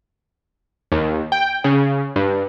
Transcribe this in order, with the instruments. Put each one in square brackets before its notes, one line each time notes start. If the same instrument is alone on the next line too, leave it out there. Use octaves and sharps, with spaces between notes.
[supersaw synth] D#2
G5
C#3
G2